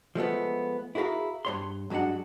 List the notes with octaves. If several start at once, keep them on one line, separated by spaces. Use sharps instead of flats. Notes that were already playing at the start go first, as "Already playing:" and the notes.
F3 G#3 A3 B3
E4 F#4 G#4 A#4 F5
G2 C#5 C6
G2 F#3 G#3 D4 F#5